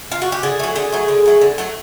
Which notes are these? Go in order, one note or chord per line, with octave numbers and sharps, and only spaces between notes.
F4
F#4
G4
D3 G#4
F#3 A3
D3 G#4
F#3 A3
D3
F#3 A3
D3
F#3 A3